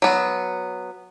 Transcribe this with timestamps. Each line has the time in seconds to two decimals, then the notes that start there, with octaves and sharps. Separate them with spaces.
0.02 F#3 B3